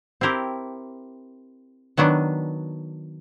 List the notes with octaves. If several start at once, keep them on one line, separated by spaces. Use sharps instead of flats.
C4 E4 G4 A#4
D#3 F#3 B3 D4